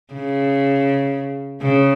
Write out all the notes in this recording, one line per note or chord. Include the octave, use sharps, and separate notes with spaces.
C#3
C#3